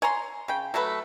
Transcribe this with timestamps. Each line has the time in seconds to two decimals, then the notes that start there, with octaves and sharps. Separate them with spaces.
0.02 C#5 G#5 A#5 C6
0.48 C#3 G5
0.74 F#3 A3 A4 B4